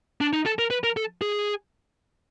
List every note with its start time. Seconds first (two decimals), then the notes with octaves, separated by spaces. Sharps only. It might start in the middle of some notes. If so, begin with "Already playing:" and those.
0.21 D4
0.33 D#4
0.46 A4
0.59 A#4
0.70 B4
0.84 A#4
0.97 A4
1.22 G#4